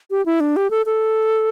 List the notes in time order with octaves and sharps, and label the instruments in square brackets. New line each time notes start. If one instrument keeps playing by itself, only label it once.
[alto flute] G4
E4
D4
G4
A4
A4